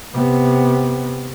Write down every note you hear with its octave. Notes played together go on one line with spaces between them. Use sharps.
C3 B3